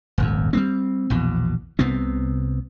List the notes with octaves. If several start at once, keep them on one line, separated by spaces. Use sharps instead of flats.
D#1 G#1 F2
G3 B3 C4
A#1 E2 B2
C2 C3 B3 C4